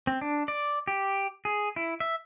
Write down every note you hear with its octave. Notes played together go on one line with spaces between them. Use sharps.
C4
D4
D5
G4
G#4
E4
E5